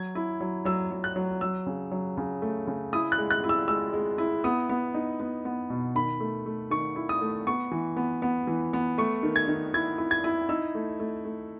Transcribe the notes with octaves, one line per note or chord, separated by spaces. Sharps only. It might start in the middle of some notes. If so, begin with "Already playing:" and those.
Already playing: F#3 G#6
E4
F#3
F#3 E6
F#3
F#6
F#3
F#3 E6
C#3
F#3
C#3
A3
C#3
E4 D#6
F#6
G#3
F#6
E4
E6
G#3 E6
G#3
E4
B3 D#6
B3
D#4
B3
B3
B2
D#3 B5
A3
A3
D#3 C#6
E4
D#6
A3
B3 C#6
E3
B3
B3
E3
B3
A3 C#6
D#3
G#6
D#3
E4 G#6
E4
G#6
E4
D#4 E6
A3
A3
A3